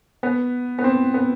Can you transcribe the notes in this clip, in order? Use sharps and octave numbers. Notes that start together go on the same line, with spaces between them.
B3
B3
C4
B3